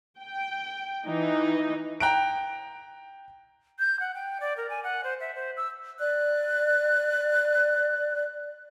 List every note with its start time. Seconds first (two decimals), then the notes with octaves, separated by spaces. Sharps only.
0.20 G5
1.06 E3 D#4
2.00 G5 A#5 F#6 D7
3.79 G6
4.00 F#5
4.15 G5
4.40 D5
4.57 A#4
4.69 G#5
4.83 F#5
5.04 C5
5.20 E5
5.35 C5
5.57 E6
5.99 D5 F#6